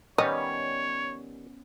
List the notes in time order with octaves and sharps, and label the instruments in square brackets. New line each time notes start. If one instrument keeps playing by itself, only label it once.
[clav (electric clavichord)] D#3 G3 [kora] B3 C#4 [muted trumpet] C#5 [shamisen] D#5